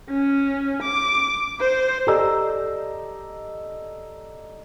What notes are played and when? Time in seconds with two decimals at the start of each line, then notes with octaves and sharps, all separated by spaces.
0.10 C#4
0.83 D6
1.60 C5
2.07 G4 A4 D5 D#5 A#5 E6